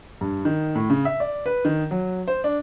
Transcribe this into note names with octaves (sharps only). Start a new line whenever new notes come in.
G2
D#3
A2
C#3
E5
D5
B4
D#3
F#3
C5
D4